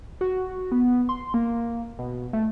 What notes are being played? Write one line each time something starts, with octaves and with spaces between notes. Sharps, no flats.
F#4
B3
C6
A#3
B2
A3